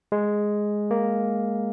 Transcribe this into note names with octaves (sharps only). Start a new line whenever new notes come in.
G#3
A#3